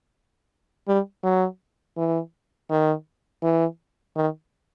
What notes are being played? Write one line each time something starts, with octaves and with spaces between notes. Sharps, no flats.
G3
F#3
E3
D#3
E3
D#3